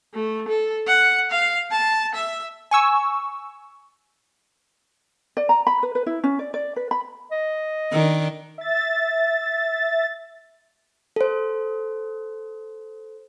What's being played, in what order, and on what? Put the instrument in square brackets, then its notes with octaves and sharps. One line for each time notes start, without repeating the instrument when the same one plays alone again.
[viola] A3
A4
F#5
F5
A5
E5
[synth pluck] G#5 C#6 E6
[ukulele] D5
A#5
B5
B4
B4
E4
C#4
D5
D5
B4
B5
[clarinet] D#5
[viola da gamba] D#3 D4
[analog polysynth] E5 A6
[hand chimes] A4 C5